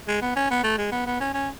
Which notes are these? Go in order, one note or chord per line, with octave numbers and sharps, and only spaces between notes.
G#3
B3
C#4
B3
A3
G#3
B3
B3
C#4
C#4